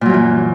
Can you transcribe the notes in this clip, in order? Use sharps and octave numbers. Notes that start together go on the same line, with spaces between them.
F#2 A#2 E3 F#3